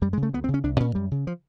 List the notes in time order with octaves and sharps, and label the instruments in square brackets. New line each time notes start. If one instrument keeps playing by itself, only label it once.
[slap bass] F#2 G3
G#3
C#3
A3
D2 B3
C4
C#3
C#4
C2 D4
A#2 C#4
F#2 G3
C#3
F3